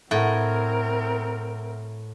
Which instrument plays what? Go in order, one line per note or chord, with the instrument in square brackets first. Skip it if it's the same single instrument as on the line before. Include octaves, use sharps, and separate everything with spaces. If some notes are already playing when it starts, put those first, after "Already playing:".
[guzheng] A2 [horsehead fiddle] C4 A#4 [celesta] E5 F#5